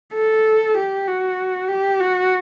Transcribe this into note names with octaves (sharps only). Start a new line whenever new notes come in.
A4
G4
F#4
G4
F#4